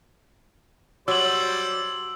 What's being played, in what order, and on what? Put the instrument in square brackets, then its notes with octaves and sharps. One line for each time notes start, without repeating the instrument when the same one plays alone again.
[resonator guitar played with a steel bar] F#3 [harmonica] G3 C5 D5 [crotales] E6 F#7